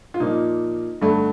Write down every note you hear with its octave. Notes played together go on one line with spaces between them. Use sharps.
F4
A#2 F3 A#3 D#4
G2 D3 A3